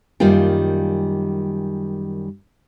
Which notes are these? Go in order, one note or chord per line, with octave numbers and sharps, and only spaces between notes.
F#2 D#3 G3 A#3 F4 G5